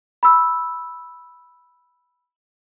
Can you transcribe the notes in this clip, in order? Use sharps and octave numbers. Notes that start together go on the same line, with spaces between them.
B5 E6